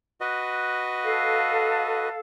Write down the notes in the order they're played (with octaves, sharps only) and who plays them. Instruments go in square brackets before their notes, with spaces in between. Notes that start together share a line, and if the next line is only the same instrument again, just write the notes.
[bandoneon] F#4 B4 D#5
[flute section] A4 F5